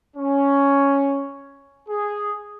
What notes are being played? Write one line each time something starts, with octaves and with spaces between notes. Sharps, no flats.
C#4
G#4